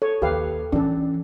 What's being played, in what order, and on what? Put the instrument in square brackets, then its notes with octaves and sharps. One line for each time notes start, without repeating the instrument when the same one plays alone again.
[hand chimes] A4 [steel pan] C#5
[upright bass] D#2 [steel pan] G4 B4 F5
[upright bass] E3 [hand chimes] C#4 [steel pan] D4 A4